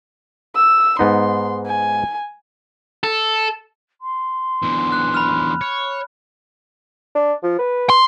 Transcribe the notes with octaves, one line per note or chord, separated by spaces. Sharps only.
E6
G#2 B3 D#4 C6
G#5
A4
C6
E2 D3
F#6
B5 F6
C#5
D4
F3
B4
C6